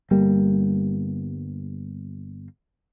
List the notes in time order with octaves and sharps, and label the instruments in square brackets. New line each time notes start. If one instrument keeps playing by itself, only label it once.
[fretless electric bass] G1 G3 A#3